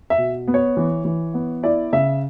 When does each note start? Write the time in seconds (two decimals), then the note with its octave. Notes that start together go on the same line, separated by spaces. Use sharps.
0.10 E5
0.18 B2
0.47 B3
0.54 C#5
0.77 E3
1.05 E3
1.34 B3
1.63 E4 D5
1.93 C#3 E5